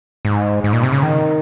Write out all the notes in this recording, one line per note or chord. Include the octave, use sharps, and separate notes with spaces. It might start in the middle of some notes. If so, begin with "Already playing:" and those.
G#2
G#2
A#2
C3
C#3
D#3